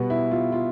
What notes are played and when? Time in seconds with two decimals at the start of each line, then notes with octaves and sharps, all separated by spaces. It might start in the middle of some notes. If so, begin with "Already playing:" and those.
Already playing: B2 G3 B3
0.10 E4
0.31 F4
0.52 F4